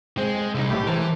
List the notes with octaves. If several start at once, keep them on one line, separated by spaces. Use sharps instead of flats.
G#3 C4
C2 D#4 E5
B1 A2 A3 G4
E3 A#4 C5 A5